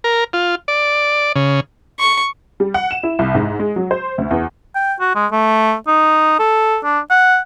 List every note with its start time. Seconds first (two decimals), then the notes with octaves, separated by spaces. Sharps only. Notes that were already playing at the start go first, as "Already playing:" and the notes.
0.04 A#4
0.33 F4
0.68 D5
1.36 C#3
2.00 C#6
2.60 G3
2.74 F#5
2.91 E7
3.03 E4
3.19 C2
3.35 G#2
3.59 G#3
3.76 F#3
3.91 C5
4.18 D2
4.31 E2
4.75 G5
5.00 F#4
5.15 G#3
5.31 A3
5.87 D#4
6.39 A4
6.84 D4
7.10 F#5